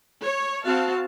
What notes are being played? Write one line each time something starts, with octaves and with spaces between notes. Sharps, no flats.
C#5
C4 F#4 F5 A5